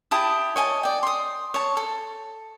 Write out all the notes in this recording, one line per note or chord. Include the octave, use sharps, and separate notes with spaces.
E4 G4 A5 D#6
C#5 D#5 G#5 A5
D5 G5
C6 D#6
C#5 A5
A4